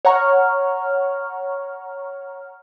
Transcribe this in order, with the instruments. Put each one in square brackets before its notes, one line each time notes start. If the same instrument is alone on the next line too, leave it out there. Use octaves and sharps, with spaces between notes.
[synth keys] C#5 F#5 A#5 C#6 F6